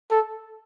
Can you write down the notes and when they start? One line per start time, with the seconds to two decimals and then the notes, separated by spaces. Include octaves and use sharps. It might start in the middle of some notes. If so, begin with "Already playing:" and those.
0.11 A4